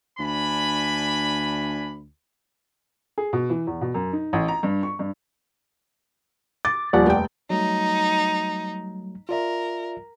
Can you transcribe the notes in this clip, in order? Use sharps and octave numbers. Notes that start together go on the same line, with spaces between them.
D2 D4 G#5 B5
G#4
B2
E3
E2
B2
F#2
D#4
A1
A#5
G2
C#6
G2
D6 A6
D#1 F3 D5 F#5
F1 G5
F#3 G3 A3 D#4
F4 A#4 D5 E5